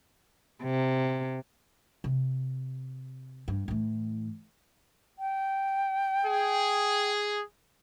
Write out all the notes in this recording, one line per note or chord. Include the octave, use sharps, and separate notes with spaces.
C3
C3
G2
A2 E3
G5
G#4